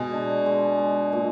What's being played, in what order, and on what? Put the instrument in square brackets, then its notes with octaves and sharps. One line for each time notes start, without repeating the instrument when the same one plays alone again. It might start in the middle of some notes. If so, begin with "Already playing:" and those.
Already playing: [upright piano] B2 [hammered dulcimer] G#3
[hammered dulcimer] D4
G#3
G#3
A#2